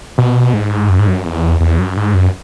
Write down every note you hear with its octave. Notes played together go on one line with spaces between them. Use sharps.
B2
G#2
F#2
G#2
F#2
E2
E2
F#2
G#2
F#2